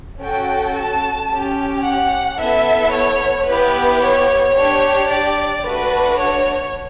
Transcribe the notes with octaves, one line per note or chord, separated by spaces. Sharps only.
C#4 F#4 A4 G5
A5
C#4 G4
F#5
B3 E4 A4 E5
C#5
B3 E4 G4 B4
C#5
D4 G4 C#5
D5
A3 D4 F#4 B4
C#5